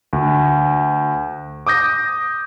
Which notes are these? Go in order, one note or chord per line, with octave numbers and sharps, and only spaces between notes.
D2
D6 D#6 G6 A#6